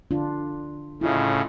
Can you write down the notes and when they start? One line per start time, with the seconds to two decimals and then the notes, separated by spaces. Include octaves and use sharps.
0.11 D3 D4 F4
1.01 A2 C#3 E4 F4 D#5